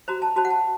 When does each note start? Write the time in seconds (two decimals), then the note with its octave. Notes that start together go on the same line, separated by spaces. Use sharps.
0.08 F#4 C5 A#5
0.22 A5
0.36 F#4 C5 A5
0.45 F#5
0.50 A5